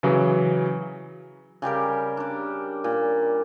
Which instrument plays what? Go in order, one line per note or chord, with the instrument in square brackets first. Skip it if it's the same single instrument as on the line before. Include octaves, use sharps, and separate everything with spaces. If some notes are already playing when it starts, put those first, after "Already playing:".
[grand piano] C#3 E3 F#3
[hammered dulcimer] C#3 G3 G4 A#4
D4 D5
A#2